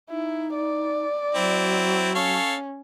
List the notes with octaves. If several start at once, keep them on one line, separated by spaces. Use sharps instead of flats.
D#4 E4
D5
F#3 C4 E4
C#4 A4 C#5 F5